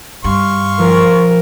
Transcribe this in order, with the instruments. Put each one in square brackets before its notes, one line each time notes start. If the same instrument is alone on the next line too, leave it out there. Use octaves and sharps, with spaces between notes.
[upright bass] G2 [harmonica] F5 C6 C#6
[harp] F3 [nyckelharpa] A#4